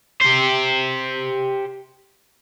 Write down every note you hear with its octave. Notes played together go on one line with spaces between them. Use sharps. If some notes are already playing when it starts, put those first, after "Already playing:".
G4 C5